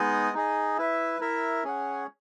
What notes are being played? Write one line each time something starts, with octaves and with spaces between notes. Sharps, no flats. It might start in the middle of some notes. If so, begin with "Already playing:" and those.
Already playing: G#3 B3 D#4 G#4 D#5
D#4 G#4 D#5
E4 B4 E5
E4 A#4 E5
C#4 G#4 C#5 F#5